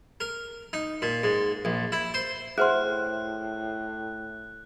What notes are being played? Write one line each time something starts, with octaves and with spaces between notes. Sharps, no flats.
A#4
D#4
A#2
G#2
A#1
E4
C5
A2 G#4 C5 E5 F#5 C6 F6 F#6